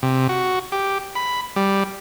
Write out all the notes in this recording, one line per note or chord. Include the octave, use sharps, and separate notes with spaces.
C3
F#4
G4
B5
G3